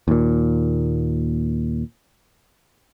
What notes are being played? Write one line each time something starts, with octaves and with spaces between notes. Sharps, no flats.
D#2 A#2